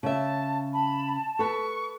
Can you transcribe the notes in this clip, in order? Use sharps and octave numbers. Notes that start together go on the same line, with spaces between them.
C#3 E5 A5
A5 B5
A4 B4 C#6